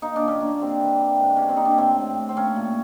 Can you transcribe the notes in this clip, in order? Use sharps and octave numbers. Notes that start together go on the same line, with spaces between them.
A#3 D#4
D4
A#2
C#4
A#3 D4
G3 C4
E3
G3
G#2
A#3 C#4
C4
A#3 D#4
D4
C#4
A2 C4
A2
A2
C4
A#3 C#4
A#2